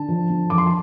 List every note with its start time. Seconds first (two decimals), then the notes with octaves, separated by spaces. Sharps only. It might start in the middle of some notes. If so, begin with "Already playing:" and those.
Already playing: D3 A5
0.08 F3
0.30 D3
0.50 F2 D6
0.58 C6
0.66 A5